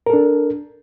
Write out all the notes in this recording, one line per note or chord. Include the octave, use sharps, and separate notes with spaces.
D4 A4 A#4